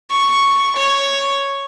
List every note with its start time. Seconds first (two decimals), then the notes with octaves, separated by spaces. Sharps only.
0.10 C#6
0.76 C#5